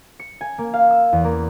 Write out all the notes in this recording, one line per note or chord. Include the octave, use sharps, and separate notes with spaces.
C#7
G#5
A#3
F5
E6
E2
A#3